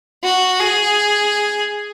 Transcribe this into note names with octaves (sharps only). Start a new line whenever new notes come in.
F#4
G#4